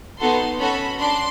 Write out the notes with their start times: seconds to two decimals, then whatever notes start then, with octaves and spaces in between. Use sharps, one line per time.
0.20 B3 D#4 F#4 A4 C6
0.59 C#4 F#4 A4 B5
1.00 D4 C6